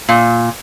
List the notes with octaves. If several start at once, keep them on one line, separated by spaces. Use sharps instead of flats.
A#2